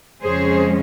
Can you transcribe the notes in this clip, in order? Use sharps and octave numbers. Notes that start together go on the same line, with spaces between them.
F2 C#3 G#3 C#4 G#4 C5